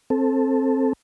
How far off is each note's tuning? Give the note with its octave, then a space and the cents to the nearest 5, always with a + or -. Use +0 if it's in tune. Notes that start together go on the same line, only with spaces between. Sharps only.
C4 +15 A4 +0